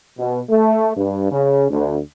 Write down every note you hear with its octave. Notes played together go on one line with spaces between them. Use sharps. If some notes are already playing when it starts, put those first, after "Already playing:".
B2
A3
G2
C#3
D2